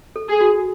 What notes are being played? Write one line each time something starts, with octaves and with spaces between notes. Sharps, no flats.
A4
G#4
F#4